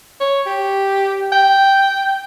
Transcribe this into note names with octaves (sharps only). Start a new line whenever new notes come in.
C#5
G4
G5